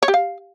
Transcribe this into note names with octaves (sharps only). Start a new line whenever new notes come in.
C#5
G4
F5